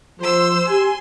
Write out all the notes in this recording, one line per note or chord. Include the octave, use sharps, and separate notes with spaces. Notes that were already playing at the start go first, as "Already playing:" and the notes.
F3 C5 C6 E6
G4 G#5 C6